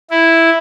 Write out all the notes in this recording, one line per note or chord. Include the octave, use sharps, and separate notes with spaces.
E4